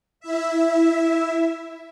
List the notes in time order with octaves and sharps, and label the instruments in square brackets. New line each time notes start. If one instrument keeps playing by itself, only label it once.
[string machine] E4 E5